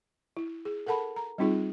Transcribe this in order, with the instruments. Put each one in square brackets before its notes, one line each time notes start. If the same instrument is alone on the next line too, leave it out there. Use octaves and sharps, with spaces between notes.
[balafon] E4
G#4
A4 A#4 F#5 A5 B5
A#5
G3 C4 D#4 F4 G#4